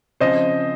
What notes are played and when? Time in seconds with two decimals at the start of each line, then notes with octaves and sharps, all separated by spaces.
0.21 C#3 F3 C4 C5 D#5